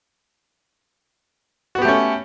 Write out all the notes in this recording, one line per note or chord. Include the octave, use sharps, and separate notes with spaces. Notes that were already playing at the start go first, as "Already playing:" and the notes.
A3 B3 C#4 F#4 G4